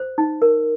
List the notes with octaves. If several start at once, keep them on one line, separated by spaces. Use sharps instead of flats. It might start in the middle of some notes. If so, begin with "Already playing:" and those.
Already playing: C5
D#4
A#4